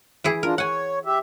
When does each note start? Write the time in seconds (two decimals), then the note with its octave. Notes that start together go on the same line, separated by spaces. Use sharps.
0.24 E3 E4 G#4
0.43 D4 F4 A#4
0.58 C#5 F#5 G#5
1.05 G4 E5